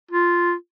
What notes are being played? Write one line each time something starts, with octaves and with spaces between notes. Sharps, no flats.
F4